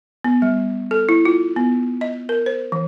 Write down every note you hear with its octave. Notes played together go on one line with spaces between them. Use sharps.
B3
G3
A4
E4
F4
B3
D#5
A#4
C5
E3